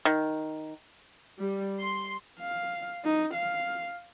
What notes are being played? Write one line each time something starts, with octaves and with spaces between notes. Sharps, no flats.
D#3
G3
C6
F5
D#4
F5